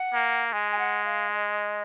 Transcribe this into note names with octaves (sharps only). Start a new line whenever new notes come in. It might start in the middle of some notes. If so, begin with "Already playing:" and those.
Already playing: F#5
A#3
G#3 G#5
G#5
F#5
F5
D#5